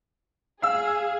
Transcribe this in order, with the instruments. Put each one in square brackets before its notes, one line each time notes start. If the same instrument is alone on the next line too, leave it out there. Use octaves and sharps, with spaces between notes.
[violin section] G#4 [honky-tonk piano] F5 E6